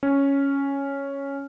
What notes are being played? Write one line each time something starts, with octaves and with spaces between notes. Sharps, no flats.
C#4